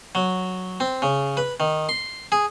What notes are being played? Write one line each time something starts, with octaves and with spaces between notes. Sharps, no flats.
F#3
C4
C#3
B4
D#3
C6
G#4